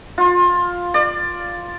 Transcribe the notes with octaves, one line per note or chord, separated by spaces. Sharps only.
F4
D5